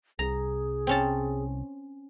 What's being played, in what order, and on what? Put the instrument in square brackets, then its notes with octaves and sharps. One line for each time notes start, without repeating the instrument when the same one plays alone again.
[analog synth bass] C2 [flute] G#4 [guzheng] A#5
[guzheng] C4 C#4 A5